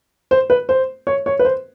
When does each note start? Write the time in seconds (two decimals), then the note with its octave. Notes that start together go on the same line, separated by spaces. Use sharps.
0.31 C5
0.50 B4
0.69 C5
1.07 C#5
1.26 C#5
1.39 B4
1.45 C5